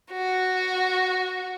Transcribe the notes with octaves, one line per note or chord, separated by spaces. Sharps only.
F#4